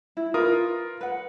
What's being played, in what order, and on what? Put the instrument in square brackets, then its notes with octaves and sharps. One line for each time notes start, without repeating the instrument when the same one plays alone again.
[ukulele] E4
[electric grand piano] F4 A#4 D#6 [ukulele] B4
[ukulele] B4 F#5